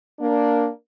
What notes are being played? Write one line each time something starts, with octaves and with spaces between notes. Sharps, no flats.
A#3 D4